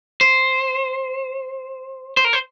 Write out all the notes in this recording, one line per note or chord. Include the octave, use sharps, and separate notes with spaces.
C5
C5
A#4
C5